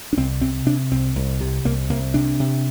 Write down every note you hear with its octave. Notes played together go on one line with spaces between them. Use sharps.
D4
C2 C4
C3 C4
C3 D4
C2 C4
C2
C3
C2 A#3
C2 A#3
C3 D4
C3